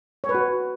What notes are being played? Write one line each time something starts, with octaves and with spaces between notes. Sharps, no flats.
C#5
B4
F#4